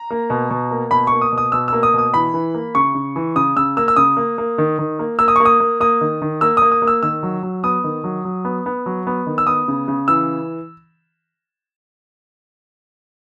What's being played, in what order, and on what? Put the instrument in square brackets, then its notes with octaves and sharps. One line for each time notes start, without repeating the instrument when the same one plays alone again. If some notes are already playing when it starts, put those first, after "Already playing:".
Already playing: [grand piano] A#5
A#3
B2
B2
A#3
B2 B5
A#3 C#6
D#6
B2
D#6
B2 E6
A#3 E6
D#6
B2 D#6
E3 B5
E3
A#3
C#3 C#6
C#3
E3
C#3 D#6
C#3 E6
A#3 E6
E6
C#3 D#6
A#3
A#3
D#3
D#3
A#3
A#3 E6
D#6
C#6
A#3
D#6
A#3
A#3 D#6
D#3
D#3
A#3 E6
A#3 D#6
D#6
A#3
E6
D#3 E6
F#3
F#3
B3 D#6
D#3
F#3
F#3
B3
B3
F#3
B3
D#3
E6
B3 D#6
C#3
C#3
E3 E6